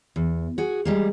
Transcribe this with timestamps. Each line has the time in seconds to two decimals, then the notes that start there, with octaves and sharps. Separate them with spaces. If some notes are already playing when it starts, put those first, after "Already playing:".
0.16 E2
0.58 F#4 G#4
0.85 G3 G#3 A#3